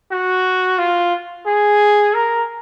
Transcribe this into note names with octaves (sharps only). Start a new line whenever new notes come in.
F#4
F4
G#4
A#4